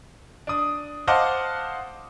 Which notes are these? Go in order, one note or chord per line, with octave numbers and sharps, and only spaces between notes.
D4 D#6
C5 D#5 F5 F#5 A5 D6